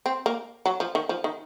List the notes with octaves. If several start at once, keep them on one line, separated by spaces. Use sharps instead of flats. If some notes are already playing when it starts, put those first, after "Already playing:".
C4
A#3
F#3
F3
D#3
F3
D#3